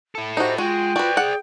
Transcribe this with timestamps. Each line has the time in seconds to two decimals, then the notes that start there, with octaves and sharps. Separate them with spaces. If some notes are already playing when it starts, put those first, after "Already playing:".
0.15 E4 A4
0.37 D#4 F#4 G4 C5
0.58 G#3 F4 F#4 G5
0.96 F#4 B4 C5 D5
1.17 G#4 F#5